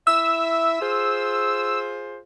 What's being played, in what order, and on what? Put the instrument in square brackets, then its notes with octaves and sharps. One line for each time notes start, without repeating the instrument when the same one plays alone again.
[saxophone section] E4 E5 [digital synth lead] E6
[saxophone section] F4 G#4 C5